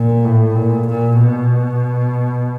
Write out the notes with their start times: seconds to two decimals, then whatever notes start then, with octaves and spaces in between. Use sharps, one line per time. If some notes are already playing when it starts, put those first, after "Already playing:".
Already playing: A#2
0.25 A2
0.56 A#2
0.88 A#2
1.20 B2